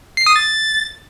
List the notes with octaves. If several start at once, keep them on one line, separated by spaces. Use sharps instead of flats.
C7
D#6
A6